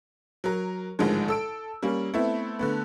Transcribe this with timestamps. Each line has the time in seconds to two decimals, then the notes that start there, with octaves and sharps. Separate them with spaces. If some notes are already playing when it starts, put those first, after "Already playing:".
0.44 F#3 A#4
0.99 A1 G#2 D3 D#3 F3 G#3
1.28 A4 E6 D7
1.82 G3 A#3 C#4
2.14 A3 B3 C4 E4
2.59 D3 A3 B3